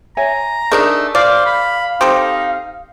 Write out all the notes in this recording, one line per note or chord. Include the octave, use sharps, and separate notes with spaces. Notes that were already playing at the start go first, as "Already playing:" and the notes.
C#5 E5 G#5 A#5
A3 D4 D#4 G#4 A#4 D#5
C5 D5 F5
B5
C4 D#4 G4 A4